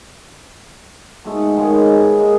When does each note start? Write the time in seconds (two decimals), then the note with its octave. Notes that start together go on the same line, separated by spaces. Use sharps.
1.25 G#2 B2 G#3 A3
1.40 F#5
1.57 D#3 F3 G#3 C#5
1.70 B3 B4
1.93 D#4
2.20 G#3 A#3 G#4